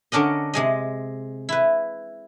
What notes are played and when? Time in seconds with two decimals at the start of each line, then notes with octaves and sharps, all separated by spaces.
0.12 D3 C#4 D4 A#4 D#5
0.54 C3 G#3 D#5
1.49 E4 B4